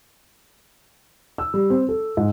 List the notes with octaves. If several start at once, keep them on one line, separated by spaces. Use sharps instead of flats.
E6
G3
C4
A4
G#2